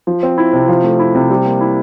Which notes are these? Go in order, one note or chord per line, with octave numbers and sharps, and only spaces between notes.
F3
C4
E4
C3
F3
A3
E4
C3
G3
A#3
E4